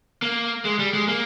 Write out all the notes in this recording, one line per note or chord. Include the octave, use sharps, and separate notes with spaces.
A#3
G#3
G3
G#3
A#3